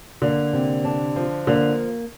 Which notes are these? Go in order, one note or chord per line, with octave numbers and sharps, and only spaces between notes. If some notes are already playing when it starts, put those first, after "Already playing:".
D3 A#3
C3
D4
F3
D3 A#3